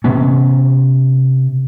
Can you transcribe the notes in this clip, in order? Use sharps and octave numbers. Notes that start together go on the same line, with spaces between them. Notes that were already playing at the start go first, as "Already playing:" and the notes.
C3 B3 C#4